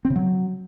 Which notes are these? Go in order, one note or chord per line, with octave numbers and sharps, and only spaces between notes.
C4
C#3
F#3